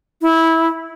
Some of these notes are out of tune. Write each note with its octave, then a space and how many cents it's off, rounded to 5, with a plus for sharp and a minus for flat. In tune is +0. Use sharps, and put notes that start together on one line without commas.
E4 -15